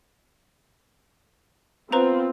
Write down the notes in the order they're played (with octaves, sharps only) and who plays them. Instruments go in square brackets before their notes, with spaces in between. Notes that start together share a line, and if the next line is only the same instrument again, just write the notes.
[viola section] B3 C4 F4 [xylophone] B4 C5 A#5